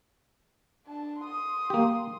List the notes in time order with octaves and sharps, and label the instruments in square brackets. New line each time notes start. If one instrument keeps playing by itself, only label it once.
[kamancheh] D4 A5
C6 D#6
[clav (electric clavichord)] A#3 G4